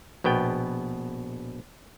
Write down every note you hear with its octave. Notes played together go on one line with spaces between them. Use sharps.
A#1 B2 B3 G5